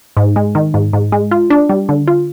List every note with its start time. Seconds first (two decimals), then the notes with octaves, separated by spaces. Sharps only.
0.17 G#2
0.36 G#3
0.55 D#3
0.74 G#2
0.93 G#2
1.12 G#3
1.31 F4
1.50 D4
1.69 G3
1.89 D3
2.08 F4